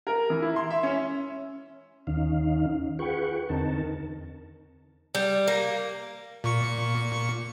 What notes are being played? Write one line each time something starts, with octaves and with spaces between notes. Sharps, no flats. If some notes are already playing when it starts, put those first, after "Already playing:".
A#4
E3
E4
C6
E5
C#4
D#2 D#3 C#4 D#4 F5
F4 G#4 B4 F#5 G5 C#6
E2 D3 C4 D#4 A#4 A5
G3
A#3
A#2 C#6 C#7